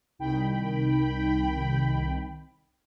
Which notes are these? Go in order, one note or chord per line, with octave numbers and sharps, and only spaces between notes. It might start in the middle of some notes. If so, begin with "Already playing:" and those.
C2 D#3 G5 B5